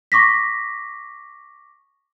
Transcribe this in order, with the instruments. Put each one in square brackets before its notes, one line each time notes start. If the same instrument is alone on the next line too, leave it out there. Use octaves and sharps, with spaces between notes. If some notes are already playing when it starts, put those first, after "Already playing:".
[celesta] C#6 D6 A#6 B6